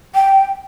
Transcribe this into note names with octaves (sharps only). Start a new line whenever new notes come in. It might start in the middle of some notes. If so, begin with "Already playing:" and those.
G5